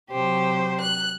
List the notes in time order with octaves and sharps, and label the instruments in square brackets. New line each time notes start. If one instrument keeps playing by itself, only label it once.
[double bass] C3 F#3 [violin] G4 C5
[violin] F#6